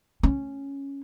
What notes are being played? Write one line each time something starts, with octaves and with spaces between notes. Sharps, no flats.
C#4